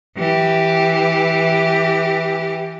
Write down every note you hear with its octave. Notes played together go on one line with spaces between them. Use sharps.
E3 G4